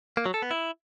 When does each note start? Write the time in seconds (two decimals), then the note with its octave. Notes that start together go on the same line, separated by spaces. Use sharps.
0.17 A#3
0.26 F#3
0.34 A4
0.42 B3
0.51 E4